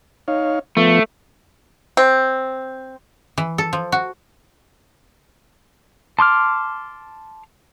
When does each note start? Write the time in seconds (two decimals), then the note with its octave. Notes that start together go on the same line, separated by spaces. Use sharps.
0.28 D#4 C#5 F5
0.77 F3 A3 B3
1.97 C4
3.38 E3
3.58 A4
3.73 F3
3.92 F#4
6.19 A5 C6 D6 F6